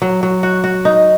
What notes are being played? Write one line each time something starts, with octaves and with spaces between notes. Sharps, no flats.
F#3
F#3
F#4
F#4
D#4